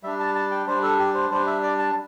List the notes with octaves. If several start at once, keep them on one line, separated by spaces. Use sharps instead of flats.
G3 D4 E5
A5
A5
G5
G3 D4 C5
A4
G4
C5
G3 D4 C5
E5
D5
A5